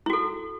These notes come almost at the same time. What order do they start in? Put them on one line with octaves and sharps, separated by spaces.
E4 F#4 A4